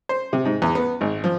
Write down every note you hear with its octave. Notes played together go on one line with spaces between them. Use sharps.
C5
C3
G#2
E2
B3
G#1
F3